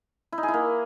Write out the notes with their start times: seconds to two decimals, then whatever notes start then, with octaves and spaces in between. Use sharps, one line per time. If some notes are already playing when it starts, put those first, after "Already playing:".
0.32 E4
0.38 D#4
0.43 G#4
0.48 E4
0.54 A#3